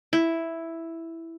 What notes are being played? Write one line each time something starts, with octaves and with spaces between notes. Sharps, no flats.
E4